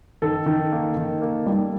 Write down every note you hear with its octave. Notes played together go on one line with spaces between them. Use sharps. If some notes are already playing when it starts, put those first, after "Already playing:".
D#3 A4
D#3
A#3
D#3
A#3
G3